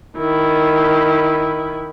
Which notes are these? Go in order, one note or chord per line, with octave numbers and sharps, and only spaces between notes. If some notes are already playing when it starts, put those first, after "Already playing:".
D#3 E4